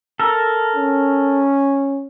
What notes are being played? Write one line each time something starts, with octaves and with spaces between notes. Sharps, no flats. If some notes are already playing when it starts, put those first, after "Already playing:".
A4 A#4
C#4